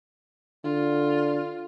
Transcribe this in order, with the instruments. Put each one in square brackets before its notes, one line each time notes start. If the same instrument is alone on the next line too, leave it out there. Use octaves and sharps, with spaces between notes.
[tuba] D3 [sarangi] F4